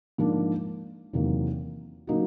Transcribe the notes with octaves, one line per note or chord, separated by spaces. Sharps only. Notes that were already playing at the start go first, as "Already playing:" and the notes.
G#2 F3 A#3 D4
E2 C3 D#3 F#3 A#3
C#3 F#3 A#3 D#4 F#4